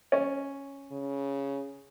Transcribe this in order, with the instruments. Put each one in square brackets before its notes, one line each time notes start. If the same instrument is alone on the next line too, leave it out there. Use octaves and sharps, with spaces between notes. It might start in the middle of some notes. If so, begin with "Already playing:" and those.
[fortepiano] C#4
[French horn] C#3